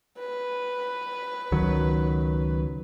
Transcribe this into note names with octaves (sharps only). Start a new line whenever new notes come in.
B4
C#2 D#3 F#3